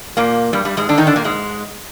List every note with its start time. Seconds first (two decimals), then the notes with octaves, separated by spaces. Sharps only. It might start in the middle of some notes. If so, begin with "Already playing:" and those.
0.17 A#2 A#3
0.53 G2 G3
0.65 G2 G3
0.77 G#2 G#3
0.89 D3 D4
0.98 D#3 D#4
1.07 D3 D4
1.16 A#2 A#3
1.25 G#2 G#3